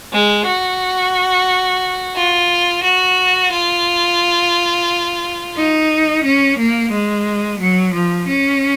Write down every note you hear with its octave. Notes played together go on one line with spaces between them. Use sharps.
G#3
F#4
F4
F#4
F4
D#4
C#4
A#3
G#3
F#3
F3
C#4